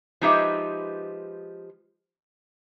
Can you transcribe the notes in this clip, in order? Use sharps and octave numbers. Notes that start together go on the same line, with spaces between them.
F3 G#3 D#4 G4 B4 E5